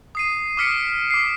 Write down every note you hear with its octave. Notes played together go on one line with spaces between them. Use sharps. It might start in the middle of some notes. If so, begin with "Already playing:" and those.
D#6 C7 D#7
D6 D#6 F6 B6 C#7 D7
D6 C7